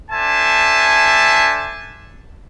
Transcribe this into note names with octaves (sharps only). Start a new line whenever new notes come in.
D4 A4 C5 E5 G#5 A5